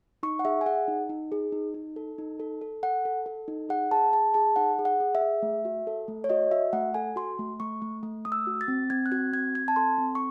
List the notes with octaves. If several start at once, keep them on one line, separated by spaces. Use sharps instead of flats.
D#4 C#6
F#5
G#4 E5
G#5
G#4 F#5
D#4
D#4
G#4
D#4
D#4
A4
D#4
A4
A4
A4 F#5
A4
A4
D#4
G#4 F#5
G#4 A5
G#4 A5
G#4 A5
D#4 F#5
G#4
F#5
G#4
E5
G#4
A3
F#4
A4
A3
C#5
F#4 D#5
F#4 E5
A3 F#5
A4 G#5
F#4 C6
A3
A3 C#6
A3
A3
A3 D#6
E6
F#4
A6
C4
C4 G#6
F#6
F#4 G#6
C4 G#6
C4 G#6
A5
A4 C6
C4
C#6